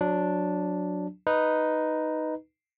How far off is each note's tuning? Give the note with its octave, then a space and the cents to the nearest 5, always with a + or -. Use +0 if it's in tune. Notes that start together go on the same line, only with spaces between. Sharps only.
F#3 -20 D4 +0
D#4 +0 B4 +0